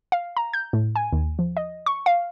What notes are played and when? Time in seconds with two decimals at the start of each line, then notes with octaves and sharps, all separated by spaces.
0.12 F5
0.37 A#5
0.53 G6
0.73 A2
0.96 G#5
1.12 D#2
1.39 F3
1.57 D#5
1.86 C#6
2.06 F5